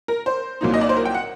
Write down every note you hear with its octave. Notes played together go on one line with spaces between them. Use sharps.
A#4
C5
C2 A#2 F#3 A#3 D#4
D#5
D5
C5
A#4
G5
F#5